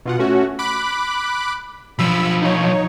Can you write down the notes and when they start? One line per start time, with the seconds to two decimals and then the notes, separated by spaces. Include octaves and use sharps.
0.06 B2 F4 F#5
0.19 A3 C#4 F#4
0.59 B5 D6 F#6
1.99 B1 F3 B5 E6
2.42 D#4 C#5